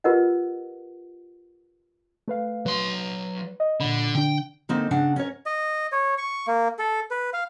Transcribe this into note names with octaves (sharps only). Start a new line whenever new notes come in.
F4 G4 A#4 B4 D#5 F#5
A3 B4 F5
F#3 B4 C6
D#5
A#2 D3 B5
D3 D4 G5
D3 A#3 C4 D#4
C#3 D4 F#5
C#4 A#4 C#5
D#5
C#5
C#6
A#3
A4
B4
F5